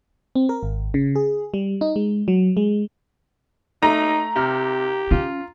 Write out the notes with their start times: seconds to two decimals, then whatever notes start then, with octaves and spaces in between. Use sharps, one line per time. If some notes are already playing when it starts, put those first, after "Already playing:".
0.35 C4
0.49 A#4
0.63 G#1
0.94 C#3
1.16 G#4
1.54 G3
1.81 D#4
1.96 G#3
2.28 F#3
2.57 G#3
3.83 A3 D#4 A#5
4.36 C3 G4 F6
5.11 C#4 F4